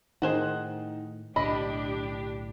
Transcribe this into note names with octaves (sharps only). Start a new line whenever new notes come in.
A2 D#3 D#4 G#4 C5 F#5
B1 A2 D3 D4 G4 D#5 B5